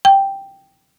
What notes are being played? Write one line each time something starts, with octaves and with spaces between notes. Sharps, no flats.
G5